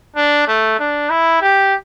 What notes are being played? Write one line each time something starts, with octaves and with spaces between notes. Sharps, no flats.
D4
A3
D4
E4
G4